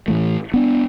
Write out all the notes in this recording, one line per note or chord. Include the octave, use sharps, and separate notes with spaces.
A2 E3 A3
B3 D4